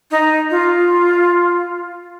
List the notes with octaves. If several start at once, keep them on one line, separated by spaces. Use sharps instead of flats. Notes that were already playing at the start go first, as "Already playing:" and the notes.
D#4
F4